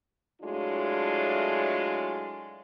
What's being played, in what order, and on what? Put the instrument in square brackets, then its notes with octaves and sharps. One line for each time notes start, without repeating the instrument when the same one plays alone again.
[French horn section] A2 F#3 G#3 D4 F4